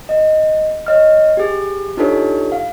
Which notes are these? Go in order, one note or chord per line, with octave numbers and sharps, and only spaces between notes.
D#5
C#5 D#5 F6
G4 G#4
D4 D#4 F4 G4 A4 C#5
F5